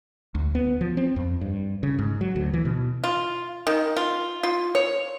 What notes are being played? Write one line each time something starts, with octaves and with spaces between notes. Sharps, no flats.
D2
B3
F3
C4
F2
G2
C#3
G#2
F#3
D2
E3
B2
F4
D#3
F4
F4
C#5